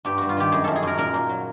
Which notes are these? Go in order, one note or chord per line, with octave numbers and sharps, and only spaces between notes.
G2 G4
G2 F#4
F4
D#3 G4
F#2 G#4
F#2 A4
G#4
F#2 A#4
A#2 A#4
A#2
F#3